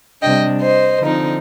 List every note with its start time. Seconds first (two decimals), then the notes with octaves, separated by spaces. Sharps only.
0.22 C3 G3 D4 D#5 G5
0.61 C5 D#5
1.01 D3 F3 C4 D#4